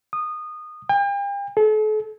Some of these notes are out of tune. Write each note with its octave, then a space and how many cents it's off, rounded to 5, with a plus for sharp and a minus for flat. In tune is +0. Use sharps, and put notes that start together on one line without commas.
D#6 -20
G5 +40
A4 -40